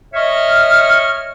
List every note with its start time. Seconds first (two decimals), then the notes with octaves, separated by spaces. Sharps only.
0.14 C#5 D#5 E5 C#6 F6